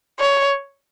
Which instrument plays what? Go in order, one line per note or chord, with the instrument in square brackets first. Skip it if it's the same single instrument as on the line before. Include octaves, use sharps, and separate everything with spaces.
[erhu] C#5